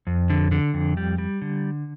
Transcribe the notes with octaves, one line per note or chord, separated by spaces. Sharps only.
F2
D3
D3
F2
G3
G3
D3